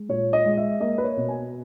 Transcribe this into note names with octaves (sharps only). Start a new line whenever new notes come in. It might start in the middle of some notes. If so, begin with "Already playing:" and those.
Already playing: G#3
A#2 C#5
D#5
G#3
E5
A#3 D#5
B4
C#5
B2
G#5